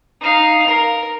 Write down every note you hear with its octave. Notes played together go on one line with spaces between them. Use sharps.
D#4 F5
A#4